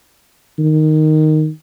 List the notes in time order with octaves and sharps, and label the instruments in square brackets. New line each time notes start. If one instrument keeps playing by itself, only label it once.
[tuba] D#3